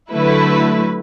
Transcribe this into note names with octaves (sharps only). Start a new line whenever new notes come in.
D3 F#3 A3 E4 B4